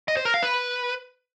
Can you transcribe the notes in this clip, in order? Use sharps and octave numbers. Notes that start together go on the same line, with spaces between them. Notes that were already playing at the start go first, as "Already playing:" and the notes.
D#5
C5
A#4
F5
B4